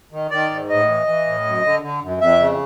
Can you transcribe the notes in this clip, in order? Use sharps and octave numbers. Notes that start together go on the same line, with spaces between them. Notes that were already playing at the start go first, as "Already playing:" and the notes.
D#3
D#3 D5
G#2
A2 D#5
E3
E3
A2
F#2
D3
D3
F#2
F2 E5
C#3